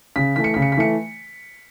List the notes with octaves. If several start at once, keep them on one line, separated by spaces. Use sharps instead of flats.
C#3 B6
E3 A3 B6
C#7
C#3 B6
C#7
B6
E3 A3 C#7